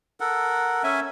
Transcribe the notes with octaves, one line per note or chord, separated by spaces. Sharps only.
A4 A#4 F#5
C#4 E5 G#5